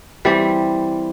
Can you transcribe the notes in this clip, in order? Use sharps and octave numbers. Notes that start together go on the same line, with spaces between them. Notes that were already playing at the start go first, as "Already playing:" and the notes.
E3 G3 C4